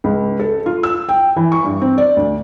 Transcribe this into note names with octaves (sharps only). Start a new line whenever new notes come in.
C#2
A4
F4
E6
G5
E3
C#6
G2
C4
D5
D2